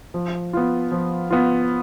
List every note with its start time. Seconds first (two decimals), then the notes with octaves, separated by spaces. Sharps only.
0.14 F3
0.53 B3 F4
0.92 F3
1.31 B3 F4